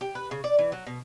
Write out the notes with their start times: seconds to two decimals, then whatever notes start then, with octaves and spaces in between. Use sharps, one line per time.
0.01 G4
0.15 B4
0.31 C#3
0.44 D5
0.58 E3
0.72 F#3
0.87 B2